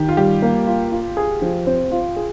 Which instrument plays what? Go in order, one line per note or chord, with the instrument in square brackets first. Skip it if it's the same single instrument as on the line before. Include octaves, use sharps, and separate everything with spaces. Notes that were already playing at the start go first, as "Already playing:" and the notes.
Already playing: [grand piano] D#3 [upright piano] G4
[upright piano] F4
[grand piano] G3 [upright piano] G4
[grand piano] A#3
F4
F4
G#4
F3
C4
F4
G#4